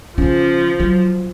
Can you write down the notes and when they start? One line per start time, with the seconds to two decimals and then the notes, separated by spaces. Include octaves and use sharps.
0.18 C#3 F3 C#4
0.80 F#3